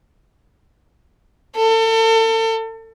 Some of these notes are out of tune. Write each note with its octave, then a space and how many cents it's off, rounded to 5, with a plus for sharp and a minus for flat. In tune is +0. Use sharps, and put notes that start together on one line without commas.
A4 +35